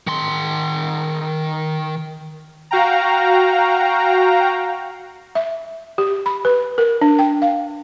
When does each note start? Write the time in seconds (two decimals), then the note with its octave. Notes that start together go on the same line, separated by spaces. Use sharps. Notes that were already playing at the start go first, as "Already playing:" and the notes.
0.07 D#3 C6
2.71 F#4 F5 G5 A#5
5.35 E5
5.98 G4
6.26 B5
6.45 B4
6.78 A#4
7.01 D4
7.19 G5
7.42 F5